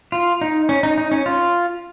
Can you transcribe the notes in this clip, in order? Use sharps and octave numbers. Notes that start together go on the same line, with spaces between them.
F4
D#4
C#4
D#4
D#4
C#4
F4